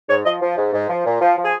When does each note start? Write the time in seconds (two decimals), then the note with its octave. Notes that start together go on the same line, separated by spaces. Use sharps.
0.09 G#2 C#5
0.25 F3 D#5
0.42 F3
0.57 G#2
0.73 G#2
0.89 F3
1.05 A#2
1.21 F3
1.37 F3
1.44 G#4